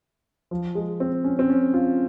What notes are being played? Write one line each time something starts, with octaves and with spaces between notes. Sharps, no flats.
F3
G#3
C4
C#4
C4
C#4
F4